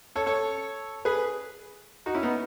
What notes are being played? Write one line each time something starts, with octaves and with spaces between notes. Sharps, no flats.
A4 C#5
A4 C#5
G#4 B4
D#4 F#4
C#4 E4
B3 D#4